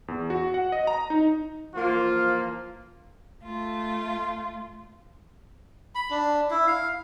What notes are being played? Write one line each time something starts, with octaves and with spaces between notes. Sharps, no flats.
E2
F#4
F#5
D#5
A#5
D#4
E3 F3 A#3 F4
A3 F4
B5
D4
E4
F5